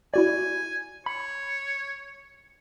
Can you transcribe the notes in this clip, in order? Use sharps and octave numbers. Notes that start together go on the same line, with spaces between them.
E4 F#4 D5 G#5
C#5 B5